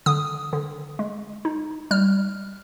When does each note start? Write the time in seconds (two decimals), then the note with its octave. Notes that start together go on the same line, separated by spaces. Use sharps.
0.06 D3 D#6
0.53 D3
0.99 G#3
1.45 D#4
1.91 G3 F6